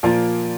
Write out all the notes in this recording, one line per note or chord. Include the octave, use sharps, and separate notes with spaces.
A#2 F3 A#3 F4 A#4